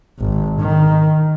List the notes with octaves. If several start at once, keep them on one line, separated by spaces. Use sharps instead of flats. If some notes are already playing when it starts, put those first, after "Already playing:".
G#1
D#3